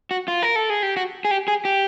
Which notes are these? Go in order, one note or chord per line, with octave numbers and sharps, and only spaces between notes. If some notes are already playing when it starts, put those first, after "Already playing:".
F#4
F4
A#4
A4
G#4
G4
F#4
G#4
G4
G#4
G4